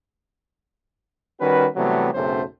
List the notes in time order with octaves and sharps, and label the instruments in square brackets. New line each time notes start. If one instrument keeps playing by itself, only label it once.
[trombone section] D#3 G3 C#4 F#4 B4
C3 E3 F#3 G3 A3 B3
B1 F#2 C#3 A3 C4 C5